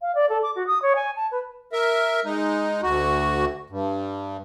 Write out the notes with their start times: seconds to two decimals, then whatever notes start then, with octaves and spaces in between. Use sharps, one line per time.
0.01 F5
0.15 D5
0.29 A4
0.43 D6
0.55 F#4
0.67 D#6
0.82 C#5
0.95 G#5
1.16 A5
1.31 B4
1.73 A#4 E5
2.25 G#3 D#4
2.83 D2 F#4
3.70 G2